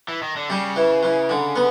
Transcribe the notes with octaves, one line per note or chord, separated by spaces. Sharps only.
E3
D#3
D3
C#3 G3
E3
E3
D3
B3